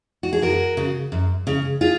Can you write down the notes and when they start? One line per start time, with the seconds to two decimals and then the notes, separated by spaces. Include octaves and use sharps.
0.23 F#4
0.33 G#4
0.42 F#2 F#4 A#4
0.77 C#3
1.12 F#2
1.47 C#3
1.81 F4 G#4